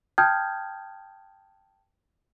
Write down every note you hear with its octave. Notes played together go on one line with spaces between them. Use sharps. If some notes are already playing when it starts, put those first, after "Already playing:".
G5 A5 D#6 F6 G6 G#6